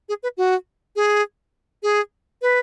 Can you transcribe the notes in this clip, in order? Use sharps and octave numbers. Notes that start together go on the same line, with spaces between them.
G#4
B4
F#4
G#4
G#4
B4